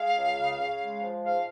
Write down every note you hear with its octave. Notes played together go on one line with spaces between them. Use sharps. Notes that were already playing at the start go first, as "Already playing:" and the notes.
Already playing: G#3 F5
C#2
C#3
C#3
G#3
F3
G#2 F5